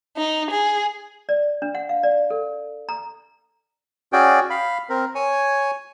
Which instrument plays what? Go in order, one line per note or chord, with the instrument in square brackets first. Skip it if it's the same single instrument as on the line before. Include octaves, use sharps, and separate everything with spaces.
[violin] D#4
G#4
[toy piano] D5
D4
F#5
F5
D5
A4
A#5
[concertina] C#4 F#4 G#4 D5 G5
F5 B5
C4 A#4
C#5 G#5